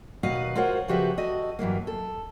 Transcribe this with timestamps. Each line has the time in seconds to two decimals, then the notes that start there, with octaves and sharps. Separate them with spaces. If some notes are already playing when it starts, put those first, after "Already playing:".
0.23 D#2 B2 F#4 B4 D#5 F5
0.56 F4 F#4 A#4 C5 C#5 F#5
0.88 C#3 F3 F#4 G4 B4 E5
1.18 F#4 A4 D#5
1.59 G2 E3 F#3 A#3
1.87 A4